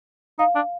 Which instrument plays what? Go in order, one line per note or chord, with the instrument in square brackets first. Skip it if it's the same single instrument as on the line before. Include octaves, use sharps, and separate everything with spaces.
[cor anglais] D#4 [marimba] F5
[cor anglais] D4